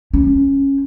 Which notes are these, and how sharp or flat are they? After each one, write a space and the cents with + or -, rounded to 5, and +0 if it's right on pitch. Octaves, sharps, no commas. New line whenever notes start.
C#4 -10